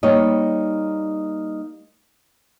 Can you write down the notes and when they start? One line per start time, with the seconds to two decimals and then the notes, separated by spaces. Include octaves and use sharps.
0.03 G3 A#3 D#4 C#5 D#5